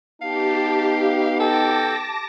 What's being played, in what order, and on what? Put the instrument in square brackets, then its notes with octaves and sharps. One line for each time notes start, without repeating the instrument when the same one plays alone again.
[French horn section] B3 D#4 [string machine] G4 [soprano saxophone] F5 [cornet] A5
[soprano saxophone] A4 [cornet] G5 [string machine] A5 D6 A#6